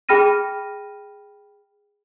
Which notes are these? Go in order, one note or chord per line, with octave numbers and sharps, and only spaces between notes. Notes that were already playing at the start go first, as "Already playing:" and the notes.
G#4 G5 B5 F6 A#6 D#7